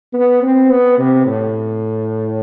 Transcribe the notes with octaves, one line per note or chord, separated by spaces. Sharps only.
B3
C4
B3
C3
A2